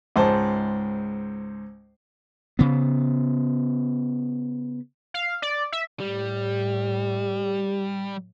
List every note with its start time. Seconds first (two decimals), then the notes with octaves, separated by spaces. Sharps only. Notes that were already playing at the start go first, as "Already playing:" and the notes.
0.16 C#2 G#2 C5 A5
2.59 C#3 B3
5.14 F5
5.42 D5
5.72 E5
6.00 A2 G3 G4